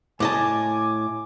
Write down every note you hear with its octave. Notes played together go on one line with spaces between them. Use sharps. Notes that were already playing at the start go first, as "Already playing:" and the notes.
A2 D#5 G#5 A5 D6